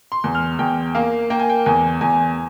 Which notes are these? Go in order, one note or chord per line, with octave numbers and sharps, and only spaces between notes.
C6
E2
F6
E2 G5
A#3 F5
A#3 G5
G#5
G5
E2 G#5
E2 G#5